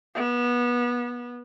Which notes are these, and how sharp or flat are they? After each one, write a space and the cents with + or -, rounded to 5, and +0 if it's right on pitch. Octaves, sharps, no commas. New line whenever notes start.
B3 -25